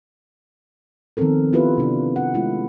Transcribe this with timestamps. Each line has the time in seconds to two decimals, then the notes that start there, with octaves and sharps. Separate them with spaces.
1.17 D#3 F3 B3 C4 A4 A#4
1.53 B3 E4 F4 G4 B4
1.78 C3 D4
2.16 F#5
2.34 G#3 A3 E4 F4